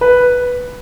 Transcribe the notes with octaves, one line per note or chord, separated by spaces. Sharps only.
B4